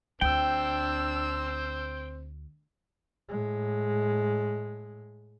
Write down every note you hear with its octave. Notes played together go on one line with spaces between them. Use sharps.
D2 C4 D4 C5 G5 E6
A2 G#3